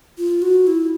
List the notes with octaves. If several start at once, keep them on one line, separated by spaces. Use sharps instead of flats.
F4
F#4
E4